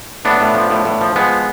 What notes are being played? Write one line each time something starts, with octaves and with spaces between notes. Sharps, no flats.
A2 B3 D4
A2
F3
A2
A2
F3
F3 G#3 B3